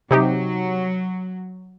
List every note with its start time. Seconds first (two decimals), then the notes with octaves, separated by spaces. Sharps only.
0.11 C3 F#3 D#4 G4